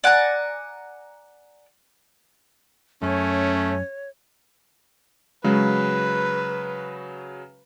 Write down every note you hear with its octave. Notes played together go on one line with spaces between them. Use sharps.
D5 F#5 G#5 A#5
F#2 A3 C#4 C#5
C#3 F#3 G#3 B4